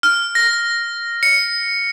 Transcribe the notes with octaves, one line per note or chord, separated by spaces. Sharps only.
F6
A#6
C#7